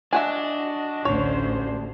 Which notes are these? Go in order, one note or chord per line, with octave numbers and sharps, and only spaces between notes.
D4 F#4 D#5 E5 F#5 G#5
A1 D2 C#4 C5 C#5